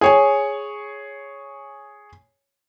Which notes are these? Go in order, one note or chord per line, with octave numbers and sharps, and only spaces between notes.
G#4 C#5 G#5